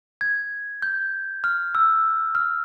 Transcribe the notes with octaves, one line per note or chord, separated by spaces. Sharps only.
G#6
G6
F6
E6
F6